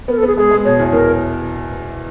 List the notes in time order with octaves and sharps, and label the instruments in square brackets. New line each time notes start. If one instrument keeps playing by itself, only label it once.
[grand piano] B3 [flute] A#4
[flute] A4
[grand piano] B3 [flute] G#4
[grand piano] G#3 [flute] G#4
[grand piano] G#3
[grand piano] B2 [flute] C#5
[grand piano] E2
[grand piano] E2 [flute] A#4